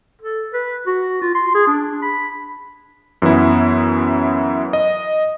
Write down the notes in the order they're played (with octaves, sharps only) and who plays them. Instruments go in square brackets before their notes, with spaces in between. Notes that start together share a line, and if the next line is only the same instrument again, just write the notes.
[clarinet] A4
B4
F#4
F4
C6
G#4
D4
B5
[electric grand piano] F#2 E3 B3 E4
D#5